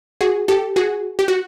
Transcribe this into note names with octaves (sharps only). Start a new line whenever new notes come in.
F#4 G#4
G4 A4
F#4 G#4
G4
F#4